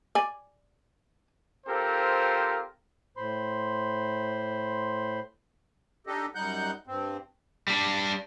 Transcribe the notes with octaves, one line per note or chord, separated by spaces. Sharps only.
D5 G#5
C4 F4 G4 A4 A#4 C5
A2 C5 B5 C6
D4 D#4 G4 A4 D#5
F#2 G3 D#4 F#5 F#6 G6
G2 C4
G3 D4